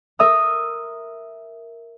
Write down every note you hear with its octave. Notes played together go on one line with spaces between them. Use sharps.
A#4 E5 D#6 F6